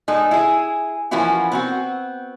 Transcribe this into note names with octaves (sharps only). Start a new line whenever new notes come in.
G#3 D#4 A4
E4 G#4
E3 F3 A#3 C#4 E4 F#4
B3 C4 F#4